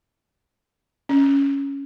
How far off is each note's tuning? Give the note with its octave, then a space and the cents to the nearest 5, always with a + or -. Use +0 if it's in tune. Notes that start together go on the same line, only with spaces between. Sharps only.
C#4 +5